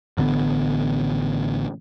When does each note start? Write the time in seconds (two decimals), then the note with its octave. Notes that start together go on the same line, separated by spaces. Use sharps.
0.18 A1 D3 A#3 B3